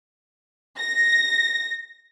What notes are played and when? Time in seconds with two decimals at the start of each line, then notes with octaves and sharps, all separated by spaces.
0.77 A#6